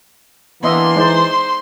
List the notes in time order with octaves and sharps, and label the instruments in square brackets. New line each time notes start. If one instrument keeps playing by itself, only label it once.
[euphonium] E3 [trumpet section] A#3 D4 [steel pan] B3 D#5 E5 [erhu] C6
[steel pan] G#3 D#4 D5 [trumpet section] C5